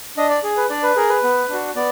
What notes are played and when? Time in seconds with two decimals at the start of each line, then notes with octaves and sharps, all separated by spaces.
0.17 D4 D#5
0.30 D5
0.43 G#4
0.57 B4
0.70 D4 D5
0.83 B4
0.96 G#4 A#4
1.09 B4
1.24 B3
1.49 D4 F#4
1.75 B3 D5